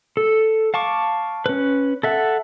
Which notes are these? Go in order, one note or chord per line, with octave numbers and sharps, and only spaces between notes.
A4
F5 A5 C#6 D6
C#4 B4
A4 E5 F#5